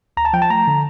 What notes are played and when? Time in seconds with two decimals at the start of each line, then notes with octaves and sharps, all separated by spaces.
0.17 D2 A#5
0.25 A5
0.33 F3 G5
0.42 A5
0.50 A3 A#5
0.67 D3